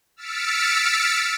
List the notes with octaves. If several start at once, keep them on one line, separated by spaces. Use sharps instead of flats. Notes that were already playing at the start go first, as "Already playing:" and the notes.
E6 F6 A6 B6 C#7 D7